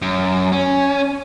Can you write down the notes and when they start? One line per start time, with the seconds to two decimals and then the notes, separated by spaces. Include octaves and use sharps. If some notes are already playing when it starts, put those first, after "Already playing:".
0.02 F#2
0.52 C#4